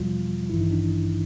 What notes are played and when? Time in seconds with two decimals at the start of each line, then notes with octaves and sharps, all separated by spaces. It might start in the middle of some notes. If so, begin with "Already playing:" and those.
Already playing: E2 B2 F3 G3 F4
0.50 A1 G2 D#3 E3 E4
0.61 D#4
0.71 D4